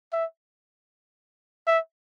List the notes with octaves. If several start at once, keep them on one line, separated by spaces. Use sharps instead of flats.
E5
E5